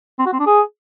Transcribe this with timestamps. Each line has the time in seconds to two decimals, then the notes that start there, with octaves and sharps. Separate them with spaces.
0.19 C4
0.26 F#4
0.33 C4
0.39 D4
0.46 G#4